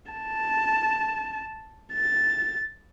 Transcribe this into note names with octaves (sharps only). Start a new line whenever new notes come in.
A5
A6